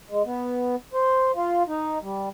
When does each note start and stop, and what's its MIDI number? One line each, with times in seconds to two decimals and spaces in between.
0.10 0.22 56
0.25 0.75 59
0.93 1.32 72
1.35 1.63 65
1.68 1.98 63
2.02 2.29 55